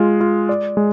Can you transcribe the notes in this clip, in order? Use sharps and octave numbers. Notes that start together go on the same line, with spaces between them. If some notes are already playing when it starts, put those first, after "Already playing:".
Already playing: G#3 F4
F4
D5
G#3